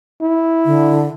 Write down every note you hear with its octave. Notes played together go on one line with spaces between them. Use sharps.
E4
D3